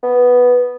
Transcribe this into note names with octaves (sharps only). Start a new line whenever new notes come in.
B3